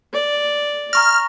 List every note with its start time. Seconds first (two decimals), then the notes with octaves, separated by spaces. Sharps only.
0.13 D5
0.93 A#5 C#6 F6 A#6